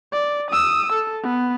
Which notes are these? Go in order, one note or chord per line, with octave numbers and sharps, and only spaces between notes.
D5
D#6 E6
A4
B3